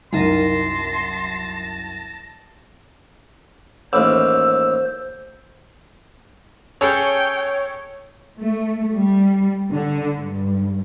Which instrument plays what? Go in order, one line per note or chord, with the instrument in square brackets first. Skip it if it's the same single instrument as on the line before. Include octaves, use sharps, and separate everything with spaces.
[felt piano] C2 F#2 [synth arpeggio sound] D#4 A#4 [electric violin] A5 A#6 [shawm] C6
[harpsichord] A1 D#2 [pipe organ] C5 [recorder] E6
[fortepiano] C#4 G#4 A4 [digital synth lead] C#5 [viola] G5
[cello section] A3
G3
D3
G2